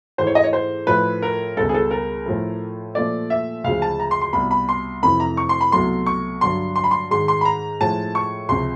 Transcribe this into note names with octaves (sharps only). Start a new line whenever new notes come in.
G#2 E3 A3 C5
C#5
D#5
C#5
C5
A2 F3 A3 B4
A#4
C#2 B2 G3 A4
G#4
A4
A#4
A2 F3 A3
A#2 F3 A3 D5
E5
D2 C#3 F3 G#3 F5
A5
A#5
C6
C6
C2 B2 G3 B5
B5
C6
F2 C3 E3 A3 B5
A#5
C#6
C6
B5
C2 B2 F#3 A3 C6
C#6
G2 D3 F#3 C6
C6
B5
C6
G#2 D#3 G#3 C6
C6
B5
A#5
A2 F3 G#3 A5
C#6
C#2 C3 F3 C6